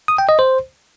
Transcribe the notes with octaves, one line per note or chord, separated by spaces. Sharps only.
D#6
G5
D#5
C5